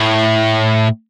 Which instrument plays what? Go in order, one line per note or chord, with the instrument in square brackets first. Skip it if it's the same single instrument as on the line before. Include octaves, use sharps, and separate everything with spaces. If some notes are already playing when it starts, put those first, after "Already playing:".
Already playing: [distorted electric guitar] A2